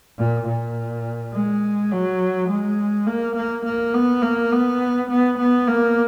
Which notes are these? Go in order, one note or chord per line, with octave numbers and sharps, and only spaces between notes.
A#2
A#2
G#3
F#3
G#3
A#3
A#3
A#3
B3
A#3
B3
B3
B3
A#3